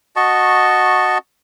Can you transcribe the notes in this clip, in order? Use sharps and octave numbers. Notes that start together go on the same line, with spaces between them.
F#4 D#5 A5 C#6